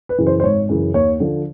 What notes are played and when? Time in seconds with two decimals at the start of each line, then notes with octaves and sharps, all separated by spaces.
0.09 B4
0.18 F#2 C#3 E3
0.27 C5
0.40 C5
0.44 G#1 C#5
0.69 F#2 C#3 E3
0.94 D#2 C#5
1.20 D3 F3